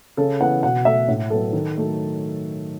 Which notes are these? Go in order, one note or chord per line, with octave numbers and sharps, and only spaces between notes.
C#3 A4
E3 B3 F#5
B2 F#5
A3 E5
A2
F#3 B3 A4
D#3
F#3 A3